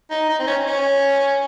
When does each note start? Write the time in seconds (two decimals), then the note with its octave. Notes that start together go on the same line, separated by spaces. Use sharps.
0.11 D#4
0.29 D#4
0.39 C4
0.47 C#4
0.66 C#4